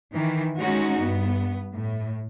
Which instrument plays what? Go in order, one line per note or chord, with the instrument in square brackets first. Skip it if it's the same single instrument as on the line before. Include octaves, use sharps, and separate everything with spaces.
[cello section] D#3 E3
G#3 C#4 D#4 F#4
G2 B3
A2